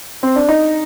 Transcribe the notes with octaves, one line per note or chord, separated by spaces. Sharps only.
C4
D4
D#4